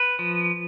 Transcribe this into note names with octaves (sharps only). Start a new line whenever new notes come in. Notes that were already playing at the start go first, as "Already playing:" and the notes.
Already playing: B4
F3